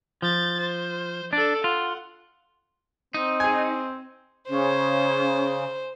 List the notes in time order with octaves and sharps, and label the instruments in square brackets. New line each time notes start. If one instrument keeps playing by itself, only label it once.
[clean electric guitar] F3 [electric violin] G6 A6
[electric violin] C5
[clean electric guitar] D4 [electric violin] A4 D5
[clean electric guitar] F4 [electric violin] F#5
[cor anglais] C4 [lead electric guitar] D#4
[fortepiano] G#4 G#5
[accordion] C#3 [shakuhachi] C#4 [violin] C5